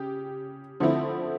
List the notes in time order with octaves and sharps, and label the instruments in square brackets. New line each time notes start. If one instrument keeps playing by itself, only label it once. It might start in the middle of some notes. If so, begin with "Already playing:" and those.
Already playing: [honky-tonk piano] C#3 G4
D3 F3 A3 C4 E4